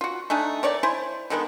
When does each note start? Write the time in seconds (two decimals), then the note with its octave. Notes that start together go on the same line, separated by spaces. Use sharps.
0.01 F4 F#4
0.30 A3 D4 D#4 G#5
0.63 D#3 C#5 D5 C#6
0.83 E4 C5 G#5
1.30 D3 D#3 G#3 B3